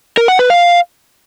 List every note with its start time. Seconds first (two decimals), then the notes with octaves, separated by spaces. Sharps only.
0.17 A#4
0.28 F#5
0.39 B4
0.50 F5